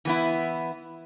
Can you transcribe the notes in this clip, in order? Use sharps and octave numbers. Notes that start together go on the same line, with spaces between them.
E3 B3 E4